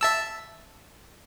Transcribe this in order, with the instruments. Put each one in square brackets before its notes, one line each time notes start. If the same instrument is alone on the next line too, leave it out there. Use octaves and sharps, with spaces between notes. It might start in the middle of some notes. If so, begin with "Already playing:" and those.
[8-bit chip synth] E5 A5 E6